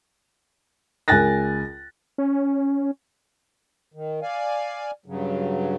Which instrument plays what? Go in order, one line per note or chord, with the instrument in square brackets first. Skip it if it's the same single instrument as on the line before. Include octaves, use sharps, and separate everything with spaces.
[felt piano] C#2 A#4 G#5 F#6 A6 A#6
[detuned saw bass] C#4
[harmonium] D#3
D5 F5 G#5
G2 C#3 F#3